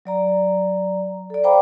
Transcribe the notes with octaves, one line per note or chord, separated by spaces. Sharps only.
F#3 D5 A#5
A4 D5
C5 F5 G5 A#5 B5 D6